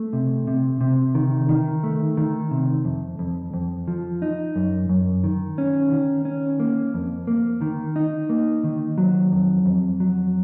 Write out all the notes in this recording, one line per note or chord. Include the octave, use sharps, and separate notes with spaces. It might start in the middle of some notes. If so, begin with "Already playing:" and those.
Already playing: A3
C3
C3
C3
D#3
D#3
A3
D#3
C3
F2
F2
F2
F3
D#4
F#2
F#2
D#3
C#4
D#3
C#4
A#3
F2
A#3
D#3
D#4
A#3
D#3
F#3
F2
F2
F#3